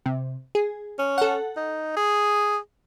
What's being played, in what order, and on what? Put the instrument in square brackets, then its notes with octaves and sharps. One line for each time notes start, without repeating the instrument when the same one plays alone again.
[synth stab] C3
G#4
[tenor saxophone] C#4
[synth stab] A4 F#5
[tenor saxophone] D#4
G#4